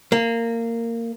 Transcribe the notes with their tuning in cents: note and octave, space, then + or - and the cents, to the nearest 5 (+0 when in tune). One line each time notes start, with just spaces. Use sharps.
A#3 -15